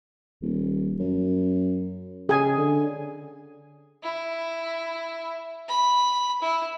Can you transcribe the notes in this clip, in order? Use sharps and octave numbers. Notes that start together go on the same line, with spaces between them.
D#1
F#2
C#3 G#4 G#5
D3
E4
B5
E4